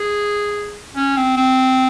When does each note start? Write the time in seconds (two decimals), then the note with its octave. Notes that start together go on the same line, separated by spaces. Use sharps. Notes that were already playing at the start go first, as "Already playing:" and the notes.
Already playing: G#4
0.96 C#4
1.16 C4
1.37 C4